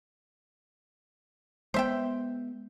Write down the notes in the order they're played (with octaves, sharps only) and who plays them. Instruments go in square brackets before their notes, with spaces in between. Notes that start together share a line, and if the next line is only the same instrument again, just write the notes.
[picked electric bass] G#3 A3 B3 [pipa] C5 E5 G5